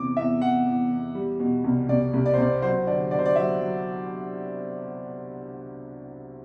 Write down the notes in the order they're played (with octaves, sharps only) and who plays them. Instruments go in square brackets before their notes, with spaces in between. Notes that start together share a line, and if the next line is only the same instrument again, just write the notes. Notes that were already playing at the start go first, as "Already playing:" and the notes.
Already playing: [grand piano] E2 C3 D6
E2 E5
E2 F#5
E2
E2
G3
B2
C2
C2 D5
C2
D5
C5
C2 D5
F#3 C5
D3 D5
D3 D5
C5
D5
F#3 E5
F#3